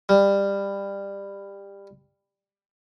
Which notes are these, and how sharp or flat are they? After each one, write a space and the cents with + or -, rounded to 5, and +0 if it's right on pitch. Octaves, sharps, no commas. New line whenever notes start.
G3 +20